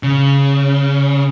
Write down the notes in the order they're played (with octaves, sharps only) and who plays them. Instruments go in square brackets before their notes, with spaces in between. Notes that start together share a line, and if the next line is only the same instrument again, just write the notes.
[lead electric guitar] C#3